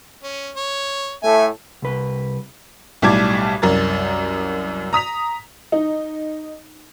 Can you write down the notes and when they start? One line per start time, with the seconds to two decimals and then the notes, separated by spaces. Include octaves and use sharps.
0.23 C#4
0.56 C#5
1.23 A2 A3 E5 G#5
1.82 C2 B4
3.02 B1 A2 G3 A5 D6 G#6
3.62 C2 F#2 A#4 A6
4.93 A#5 D#6 B6 F7
5.72 D#4